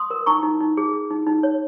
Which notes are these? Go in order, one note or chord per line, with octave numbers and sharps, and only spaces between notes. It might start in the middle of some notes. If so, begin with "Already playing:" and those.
Already playing: C6 D#6
A#4
D#4 A#5 C#6
D#4
D#4
G#4
G#4
D#4
D#4
C#5